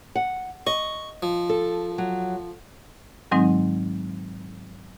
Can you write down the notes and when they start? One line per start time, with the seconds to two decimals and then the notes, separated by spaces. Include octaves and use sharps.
0.15 F#5
0.67 D#5 C#6
1.22 F3
1.49 A4
1.98 F#3
3.31 G#2 D#3 F#3 G#3 C4 D#4